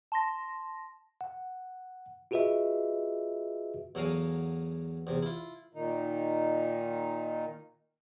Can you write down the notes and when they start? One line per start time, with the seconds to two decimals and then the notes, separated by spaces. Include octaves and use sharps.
0.12 A5 C6 A#6
1.21 F#5
2.31 F4 F#4 G#4 B4 D#5 E5
3.95 E2 F#3 A4 A#4 F5 G#5
5.07 E2 C3
5.23 E4 F4
5.74 A#2 D#3 D#4